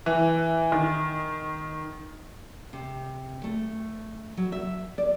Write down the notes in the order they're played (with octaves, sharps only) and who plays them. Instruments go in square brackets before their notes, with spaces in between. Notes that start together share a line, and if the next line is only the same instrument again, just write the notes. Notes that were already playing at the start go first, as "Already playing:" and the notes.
[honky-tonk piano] E3
D#3
[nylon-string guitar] C3
A3
F#3
E5
D5